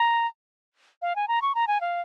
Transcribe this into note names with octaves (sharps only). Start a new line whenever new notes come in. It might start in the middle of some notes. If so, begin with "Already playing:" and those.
Already playing: A#5
F5
G#5
A#5
C#6
A#5
G#5
F5